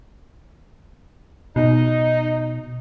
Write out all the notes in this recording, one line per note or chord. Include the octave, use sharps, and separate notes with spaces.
B2 D#4